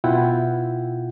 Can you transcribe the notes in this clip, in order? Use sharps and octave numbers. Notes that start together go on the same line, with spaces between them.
B2 E4 F4 F#5 G5